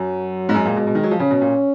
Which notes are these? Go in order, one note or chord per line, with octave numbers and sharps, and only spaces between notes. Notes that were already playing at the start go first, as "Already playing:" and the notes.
Already playing: F#2 F#3
G#2
F#2 G#3
A#2
B2
B2
D#3
F#3
F3
C#3 C#4
B2
A#2